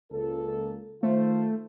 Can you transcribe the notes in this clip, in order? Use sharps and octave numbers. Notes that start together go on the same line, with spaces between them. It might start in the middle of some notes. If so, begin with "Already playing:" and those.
C#2 A#3 A4
D#3 A3 F4 C5